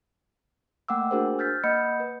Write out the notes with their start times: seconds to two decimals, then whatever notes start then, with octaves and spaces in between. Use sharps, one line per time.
0.89 A3 A#3 F#5 G5 D6 E6
1.11 D4 F#4 G#4 A#4 C5
1.38 E6 F6 G6 A6 B6
1.64 A#3 D#5 F#5 B5 G6 C#7
2.00 B4